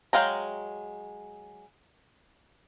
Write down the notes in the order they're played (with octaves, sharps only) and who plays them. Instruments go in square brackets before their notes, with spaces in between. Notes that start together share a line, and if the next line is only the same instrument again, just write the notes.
[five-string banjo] F#3 G#3 F5 G5 A#5